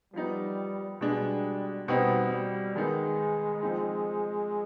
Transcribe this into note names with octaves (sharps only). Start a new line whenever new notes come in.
F3 G3 B3 D#4
B2 G3 G#3 D4
B2 G3 B3 C4 D#4
G3
D#3 G#3 B3 D#4
F3 C4 D#4